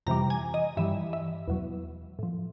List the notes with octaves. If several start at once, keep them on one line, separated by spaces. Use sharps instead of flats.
F2 C3 E3 G3 A#5
G#5
D#5
G2 E3 G3 E5
E5
E2 B2 F#3
A2 F3